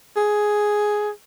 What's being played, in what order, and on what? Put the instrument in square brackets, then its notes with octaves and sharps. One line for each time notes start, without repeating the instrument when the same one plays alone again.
[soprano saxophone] G#4